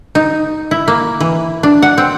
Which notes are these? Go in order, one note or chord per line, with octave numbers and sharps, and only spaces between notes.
D#4
E4
A#3
E3
D4
F#5
C4